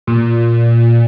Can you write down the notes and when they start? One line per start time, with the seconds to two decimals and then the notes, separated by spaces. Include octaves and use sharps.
0.07 A#2